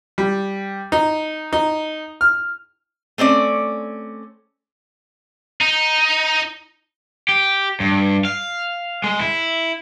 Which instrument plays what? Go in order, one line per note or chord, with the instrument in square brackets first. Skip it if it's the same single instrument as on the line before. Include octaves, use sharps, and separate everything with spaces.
[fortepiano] G3
D#4
D#4
F6
[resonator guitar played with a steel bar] A3 C4 C#4 D5
[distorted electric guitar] D#4
[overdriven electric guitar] G4
G2
F5
G#3
E4